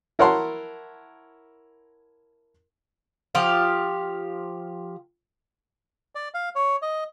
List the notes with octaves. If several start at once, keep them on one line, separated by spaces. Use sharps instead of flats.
E4 A#4 C#5 F#5 A5 C6
F3 G4 F5
D5
F5
C#5
D#5